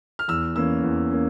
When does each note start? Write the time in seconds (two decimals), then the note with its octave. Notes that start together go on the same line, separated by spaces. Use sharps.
0.19 F6
0.28 E2 E6
0.55 E3 A#3 C#4 E6
0.83 E2
1.11 A#3 C#4